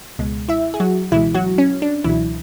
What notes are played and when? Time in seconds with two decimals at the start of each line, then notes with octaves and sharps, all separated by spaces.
0.19 C#2 B2 G#3
0.49 E4 E5
0.74 G#4
0.80 F#3 F#4
1.11 C#2 B2 E3 G#3 E4
1.35 F#3 F#4
1.58 C#4
1.82 D4
2.04 C#2 B2 E3 F#3 E4